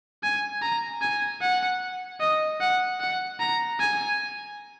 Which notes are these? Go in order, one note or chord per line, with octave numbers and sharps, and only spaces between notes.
G#5
A#5
G#5
F#5
D#5
F#5
F#5
A#5
G#5